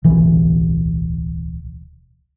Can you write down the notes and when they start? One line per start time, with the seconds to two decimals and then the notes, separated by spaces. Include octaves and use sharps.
0.04 D1 B1 E3